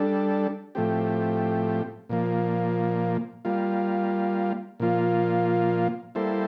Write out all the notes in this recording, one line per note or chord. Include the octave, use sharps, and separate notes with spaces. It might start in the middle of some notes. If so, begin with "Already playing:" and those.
Already playing: G3 D4 A4
A2 F3 A3 C4 G4
A#2 F3 A#3
G3 A#3 F4
A#2 F3 A#3 F4
G3 A#3 E4 A4 C5